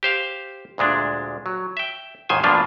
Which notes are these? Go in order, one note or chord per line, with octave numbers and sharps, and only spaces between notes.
G4 C5 F5
D2 A#2 G#3 D4
F#3
E5 G5
D#2 G#2 D#3 C5 G#5
G2 B2 F3 A#3 D4 F4